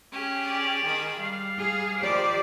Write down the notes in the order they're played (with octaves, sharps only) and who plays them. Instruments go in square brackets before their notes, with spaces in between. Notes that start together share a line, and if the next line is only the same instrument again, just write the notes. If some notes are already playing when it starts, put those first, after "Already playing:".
[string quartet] C#4 G4 G#4
[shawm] D5
[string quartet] D#3 G#4 B5
[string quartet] G3 [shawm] F5
[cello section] G#4
[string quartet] D#3 F3 G3 [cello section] G4 C5 D5